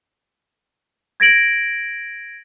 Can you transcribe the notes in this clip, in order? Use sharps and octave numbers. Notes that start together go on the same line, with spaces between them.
G#6 A#6 D7 F#7